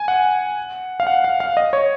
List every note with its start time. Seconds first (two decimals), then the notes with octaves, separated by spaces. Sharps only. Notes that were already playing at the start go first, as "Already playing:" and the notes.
Already playing: G#5
0.08 F#5
1.00 F5
1.07 F#5
1.24 F5
1.40 F5
1.57 D#5
1.73 C#5